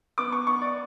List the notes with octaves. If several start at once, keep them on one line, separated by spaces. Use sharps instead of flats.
B3 D6
C#6
B3 C#6
D5